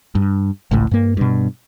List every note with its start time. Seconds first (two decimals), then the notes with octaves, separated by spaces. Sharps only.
0.15 G2
0.71 G#1 C#2 A2
0.91 G2 A#3
1.17 G2 B2